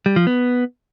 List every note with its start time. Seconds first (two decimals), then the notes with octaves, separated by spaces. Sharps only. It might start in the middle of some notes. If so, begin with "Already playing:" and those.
0.06 G3
0.16 F3
0.27 B3